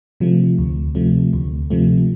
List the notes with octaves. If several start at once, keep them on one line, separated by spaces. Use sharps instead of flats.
C3 F3 A3
D2
C3 F3 A3
D2
C3 F3 A3